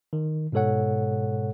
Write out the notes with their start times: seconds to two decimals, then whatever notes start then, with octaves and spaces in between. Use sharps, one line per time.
0.13 D#3
0.52 G#2 B2 G#3 A4 C#5 F#5